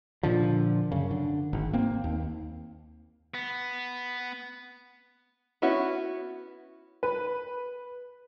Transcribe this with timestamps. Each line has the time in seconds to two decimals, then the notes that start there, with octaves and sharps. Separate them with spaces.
0.23 A#2 D3 F3
0.92 F#2 C#3
1.11 D3
1.53 G#1
1.73 A#3 C4
2.04 D#2
3.34 B3
5.62 B3 C#4 E4 F#4
7.03 B4